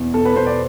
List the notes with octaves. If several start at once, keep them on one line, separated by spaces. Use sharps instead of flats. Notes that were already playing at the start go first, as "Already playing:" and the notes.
Already playing: E2 B2
B2 A4
B4
B2 C5
D5